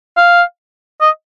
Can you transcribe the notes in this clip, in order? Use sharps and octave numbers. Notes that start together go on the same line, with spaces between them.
F5
D#5